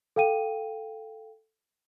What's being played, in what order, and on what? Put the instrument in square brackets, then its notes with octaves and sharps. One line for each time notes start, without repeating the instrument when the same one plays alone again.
[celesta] A4 F5 G5 D#7